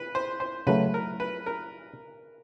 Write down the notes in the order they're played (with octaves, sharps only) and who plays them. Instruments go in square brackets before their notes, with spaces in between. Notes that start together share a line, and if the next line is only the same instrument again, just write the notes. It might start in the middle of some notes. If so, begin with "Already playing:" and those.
Already playing: [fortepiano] B4
C5
C5
[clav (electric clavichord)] C#3 F#3 A3 [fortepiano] B4
[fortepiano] A#4
B4
A#4